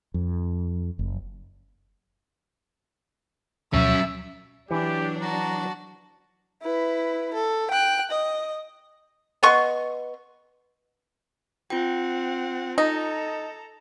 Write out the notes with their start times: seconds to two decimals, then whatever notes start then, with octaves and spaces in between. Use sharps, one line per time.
0.14 F2
0.99 F#1
3.73 D2 B2 F3 F#3 C#4 E5
4.71 E3 F#3 D4 G4
5.22 F#4 A5 A#5
6.62 E4 B4
7.34 A4
7.71 G5 F#6
8.11 D#5
9.43 B3 D#5 C6 C#6
11.70 C4 F4 F#5 G5
12.78 D#4 A4 A#5